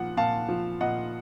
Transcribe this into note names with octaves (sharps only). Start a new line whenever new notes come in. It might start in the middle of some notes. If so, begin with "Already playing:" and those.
Already playing: A#2 F3 F#5
A#2 F5 A5
F3
A#2 D#5 F#5